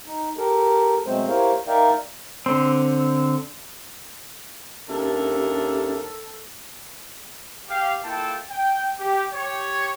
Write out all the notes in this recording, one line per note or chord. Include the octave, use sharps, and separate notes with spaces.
D#4
G4 A4 A#4
B2 F#3 G#3 A3 C4 C5
E4 G4 A#4 C5 C#5 F5
D#4 A#4 D5 E5 F5 G5
D3 C4
D#2 C#4 D4 G4 A4 A#4 E5
G4 F5
A#3 E4 F4 A4 G5 A5
G5
G4
G4 C#5